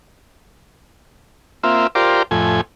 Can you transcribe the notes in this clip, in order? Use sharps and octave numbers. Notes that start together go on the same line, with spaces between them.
A#3 C4 F4 E5
F4 G4 A#4 C5 D5
F2 A2 G#5